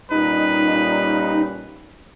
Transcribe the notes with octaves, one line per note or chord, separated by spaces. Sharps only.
A#2 G3 C#4 D#4 B4